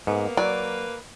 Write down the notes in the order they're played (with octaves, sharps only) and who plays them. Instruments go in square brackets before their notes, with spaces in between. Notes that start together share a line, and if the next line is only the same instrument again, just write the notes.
[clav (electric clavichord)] G#2 [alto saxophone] A#3 [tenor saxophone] B3
[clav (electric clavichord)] F#3 [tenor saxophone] B4 [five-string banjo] D5